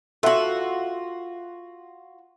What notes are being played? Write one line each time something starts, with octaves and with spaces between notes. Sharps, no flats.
F4 F#4 A4 E5 F#5